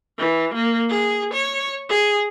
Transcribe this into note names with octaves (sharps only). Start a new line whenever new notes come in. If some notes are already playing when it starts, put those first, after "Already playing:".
E3
A#3
G#4
C#5
G#4